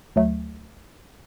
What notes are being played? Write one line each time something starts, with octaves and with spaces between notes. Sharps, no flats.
D2 F#3 A3